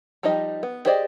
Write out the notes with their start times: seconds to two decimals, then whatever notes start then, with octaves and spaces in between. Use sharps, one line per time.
0.23 F3 G3 D#4 G4 D#5
0.63 B3
0.86 G4 G#4 C5 D5 D#5